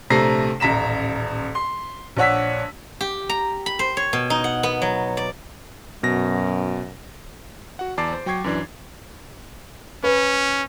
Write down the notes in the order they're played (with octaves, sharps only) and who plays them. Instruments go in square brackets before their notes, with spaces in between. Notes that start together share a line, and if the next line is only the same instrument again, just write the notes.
[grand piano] A#1 C3 A3 A#5 A#6 C7
D#1 A1 A#5 B6 E7
C6
A#1 D4 C#5 F#5 E6 B6
[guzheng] G4
A#5
B5
C5
C#5
B2
D#4
F#5
B3
F#3
D5
[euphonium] F#2 [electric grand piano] B2 A#6
[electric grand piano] F#4 F#5
E2 D5 A5 D6 A6 C7
C5
F#3 G5 C#6 G#6 C7
F#2 E3 D4
[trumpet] C#4 [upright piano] B4